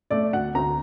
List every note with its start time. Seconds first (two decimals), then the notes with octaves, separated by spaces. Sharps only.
0.10 A3 D5
0.33 D2 F#5
0.55 D2 A#5